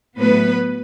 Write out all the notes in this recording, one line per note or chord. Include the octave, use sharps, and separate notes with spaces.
A2 F#3 A3 B3 B4